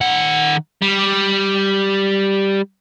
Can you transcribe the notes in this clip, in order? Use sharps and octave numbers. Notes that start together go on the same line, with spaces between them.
D#3 F#5
G3